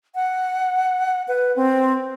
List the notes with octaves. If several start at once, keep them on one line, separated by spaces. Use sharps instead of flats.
F#5
B4
C4